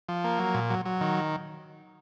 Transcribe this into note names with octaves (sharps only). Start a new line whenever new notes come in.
F3
A#3
F#3
A#2
F#3
F#3
D#3